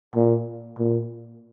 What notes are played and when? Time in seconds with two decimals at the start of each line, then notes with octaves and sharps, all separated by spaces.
0.16 A#2
0.79 A#2